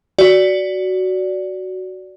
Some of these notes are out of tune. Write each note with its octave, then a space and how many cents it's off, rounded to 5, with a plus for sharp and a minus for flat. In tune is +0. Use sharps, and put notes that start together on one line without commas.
F#4 +10 D5 -10